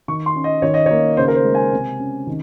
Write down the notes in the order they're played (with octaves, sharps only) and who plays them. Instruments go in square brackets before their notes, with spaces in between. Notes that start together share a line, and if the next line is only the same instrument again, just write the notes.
[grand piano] D#3 C#6
C6
C#4
D#5
D#3 C#5
D#5
C#5
A#3
C#3 C5
A#4
C5
G#3
G#5
C3
C#4
D#3